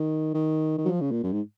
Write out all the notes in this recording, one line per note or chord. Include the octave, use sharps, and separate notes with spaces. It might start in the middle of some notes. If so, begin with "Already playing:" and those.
Already playing: D#3
D#3
D#3
F#3
F3
C#3
A#2
F#2
G#2